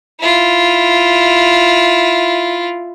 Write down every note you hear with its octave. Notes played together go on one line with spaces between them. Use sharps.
E4 F4